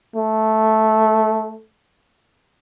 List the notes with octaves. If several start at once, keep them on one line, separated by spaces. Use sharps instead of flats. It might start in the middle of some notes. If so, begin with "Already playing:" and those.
A3